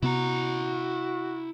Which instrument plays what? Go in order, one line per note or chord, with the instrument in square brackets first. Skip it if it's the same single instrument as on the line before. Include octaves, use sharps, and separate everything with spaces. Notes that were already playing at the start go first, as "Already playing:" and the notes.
[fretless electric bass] C3 B3 [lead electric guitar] E4 A#5 [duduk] F#4